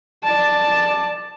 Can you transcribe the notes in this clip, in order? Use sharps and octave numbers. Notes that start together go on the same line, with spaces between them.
D5 A5